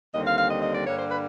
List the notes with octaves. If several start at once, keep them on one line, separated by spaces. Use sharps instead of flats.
D#2 D3 G3 C4 D#5
F5
F5
D#5
D#5
D5
G2 D3 G3 A#3 C#5
C5
B4